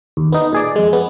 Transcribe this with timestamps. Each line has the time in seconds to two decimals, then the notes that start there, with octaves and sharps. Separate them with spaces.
0.17 D#2
0.32 B3 D#4
0.53 A#2 G#4 D5
0.76 F2 G#3
0.93 B3